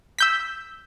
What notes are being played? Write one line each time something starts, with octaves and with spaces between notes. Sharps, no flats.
E6 G6 B6